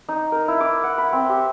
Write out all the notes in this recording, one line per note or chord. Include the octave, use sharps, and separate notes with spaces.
D#4
A#4
E4
D6
F#5
B5
C4
G4